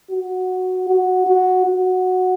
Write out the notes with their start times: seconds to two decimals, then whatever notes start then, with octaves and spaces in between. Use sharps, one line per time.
0.11 F#4
0.88 F#4
1.27 F#4
1.66 F#4